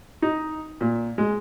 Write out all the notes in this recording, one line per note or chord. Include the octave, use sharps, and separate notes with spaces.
D#4
A#2
G#3